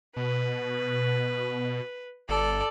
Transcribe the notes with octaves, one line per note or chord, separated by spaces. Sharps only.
B2 B4
G1 A4 D5